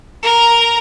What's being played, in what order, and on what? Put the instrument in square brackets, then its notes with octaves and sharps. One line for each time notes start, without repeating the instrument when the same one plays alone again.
[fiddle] A#4 A#5